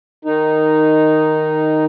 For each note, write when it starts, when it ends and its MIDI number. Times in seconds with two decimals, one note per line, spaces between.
0.25 1.85 51
0.25 1.85 63